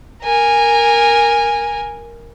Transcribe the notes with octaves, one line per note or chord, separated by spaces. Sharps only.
A#4 G#5